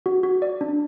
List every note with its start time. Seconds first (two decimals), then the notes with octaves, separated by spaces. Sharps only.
0.06 F#4
0.23 F#4
0.42 D5
0.61 D4